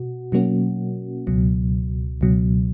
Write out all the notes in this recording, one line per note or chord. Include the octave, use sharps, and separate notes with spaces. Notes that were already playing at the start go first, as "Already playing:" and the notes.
Already playing: B2 F#4
B2 F#3 A#3 C#4 F#4
C#2 B2 F#3
C#2 B2 F#3